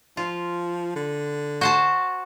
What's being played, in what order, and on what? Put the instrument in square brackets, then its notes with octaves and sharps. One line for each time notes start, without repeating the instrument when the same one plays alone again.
[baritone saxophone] F3 [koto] F4
[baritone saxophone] D3
[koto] F#4 C5 A5